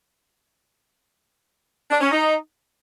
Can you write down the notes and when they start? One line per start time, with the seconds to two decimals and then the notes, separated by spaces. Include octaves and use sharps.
1.91 D4
2.01 C#4
2.11 D#4